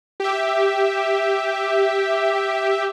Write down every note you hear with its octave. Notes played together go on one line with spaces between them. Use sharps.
G4 E5